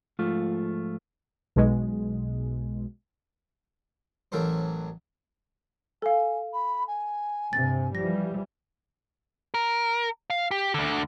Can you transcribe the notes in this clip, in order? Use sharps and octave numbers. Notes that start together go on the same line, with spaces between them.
G#2 F3 A3 F4
B1 B2 G#3
A1 E3 F#3 A4 A#4 C5
A4 F5 G#5
B5
G#5
G2 C3 A6
E3 F3 G3 A#6
A#4
F5
G4
D2 D3